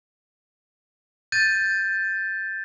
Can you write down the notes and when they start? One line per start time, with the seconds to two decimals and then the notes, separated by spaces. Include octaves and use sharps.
1.32 G6 A6 D#7